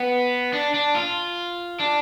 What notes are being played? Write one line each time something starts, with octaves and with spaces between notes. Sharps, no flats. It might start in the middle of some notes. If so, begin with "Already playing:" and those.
Already playing: B3
D4
D4
F4
D4